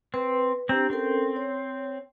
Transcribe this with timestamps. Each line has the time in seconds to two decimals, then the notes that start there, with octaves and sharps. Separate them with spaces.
0.14 C4 B4
0.69 C4 D4 G4 A#5
0.90 C4 C#4 A4 A#4
1.36 C#5